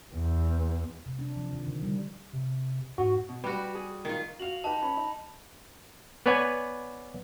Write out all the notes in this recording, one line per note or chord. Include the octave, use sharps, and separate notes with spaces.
E2
C3
D4
F3
D#3
D3
G3
C3
G#2 F#4
B2
G3 F#4 G4 B4
G#4
D#3 F4
F#4 F5 F7 F#7
D#4 G4 B4 A5
C#4 B5
D#4
B3 B4 C#5 D5 G#5